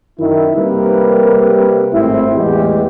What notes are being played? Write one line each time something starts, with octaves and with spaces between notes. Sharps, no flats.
F#2 D#3 E4
C3 G3 A#3 A#4 B4
G#1 A2 C4 E4
E2 A2 E3 G#3 G4